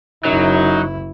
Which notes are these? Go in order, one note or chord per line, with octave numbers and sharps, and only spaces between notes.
F#1 F#2 F#3 D#4 E4